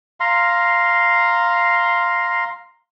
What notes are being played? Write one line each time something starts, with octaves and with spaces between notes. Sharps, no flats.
F5 A#5 C6